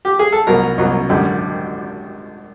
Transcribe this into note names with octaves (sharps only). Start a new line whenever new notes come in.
G4
G#4
A4
C2 B2 F#3 A#4
C2 B2 F#3
G#1 F#2 D3 G3